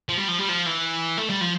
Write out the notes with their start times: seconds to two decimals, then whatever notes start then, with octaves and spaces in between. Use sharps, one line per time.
0.09 F3
0.18 G3
0.28 F3
0.39 G3
0.49 F3
0.66 E3
1.17 A3
1.30 G3
1.41 F3